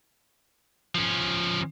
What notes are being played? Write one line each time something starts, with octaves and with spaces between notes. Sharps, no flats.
F3 C#4